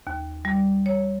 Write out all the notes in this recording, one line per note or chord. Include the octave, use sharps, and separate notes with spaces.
D#2
G3
C#5